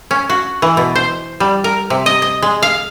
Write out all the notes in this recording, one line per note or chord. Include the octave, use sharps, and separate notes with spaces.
C#4
F#4
E3
B2
C5
G3
A#4
C3
D#5
D#5
G#3
F5